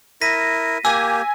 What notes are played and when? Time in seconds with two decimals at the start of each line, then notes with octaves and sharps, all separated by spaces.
0.21 E4 A#4 A#6 B6 D#7
0.85 A#3 G4 G#5 E6